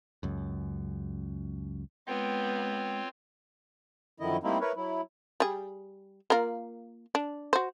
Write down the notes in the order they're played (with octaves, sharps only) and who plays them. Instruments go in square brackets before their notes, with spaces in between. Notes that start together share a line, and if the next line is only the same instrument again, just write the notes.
[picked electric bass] C#2 F#2
[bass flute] G#3 [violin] B3 [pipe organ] C4 F4 C#5 [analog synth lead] G5
[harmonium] F#2 D3 D#3 F3 E4 D#5
G3 A3 A#3 C4 D#4 E4
E4 A#4 B4 C#5
F#3 E4
[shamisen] G3 G#4
A#3 F4 A#4
D4
F#4 C5